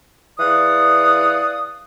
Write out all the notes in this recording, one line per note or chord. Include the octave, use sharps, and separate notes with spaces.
E3 G#4 D5 F5 F#5 D#6